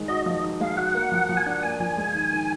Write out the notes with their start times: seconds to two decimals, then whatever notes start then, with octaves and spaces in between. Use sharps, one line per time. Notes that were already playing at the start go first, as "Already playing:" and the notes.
Already playing: D#3 G#3
0.08 F#4 D#5
0.26 F3 D#5
0.43 D#4
0.60 G#3 F5
0.77 F#4 F#5
0.95 A#3
1.12 F3
1.29 F3
1.37 G#5
1.46 D4 F#5
1.63 A#3 G#5
1.80 F3 G#5
1.97 G#3
2.15 D#3
2.32 D#3